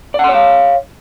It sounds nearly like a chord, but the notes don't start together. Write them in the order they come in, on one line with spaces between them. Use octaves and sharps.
D5 F#5 C6 C#5 F5